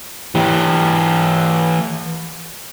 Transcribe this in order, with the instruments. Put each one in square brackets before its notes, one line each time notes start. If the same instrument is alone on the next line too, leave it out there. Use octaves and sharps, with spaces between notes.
[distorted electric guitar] E3 G4